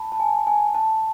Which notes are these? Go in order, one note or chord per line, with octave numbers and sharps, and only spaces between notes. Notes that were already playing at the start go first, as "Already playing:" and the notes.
Already playing: A5 B5
A5
G#5
G#5
A5